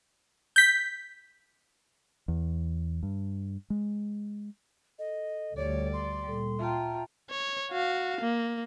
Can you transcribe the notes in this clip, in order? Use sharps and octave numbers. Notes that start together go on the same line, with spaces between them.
G6 B6
E2
G2
G#3
A4 D#5
D2 G3 C#5 D5
C6
A#2 G3 A4
F4 E5 G5 A5 A#5
C#5
F#4 F5
A#3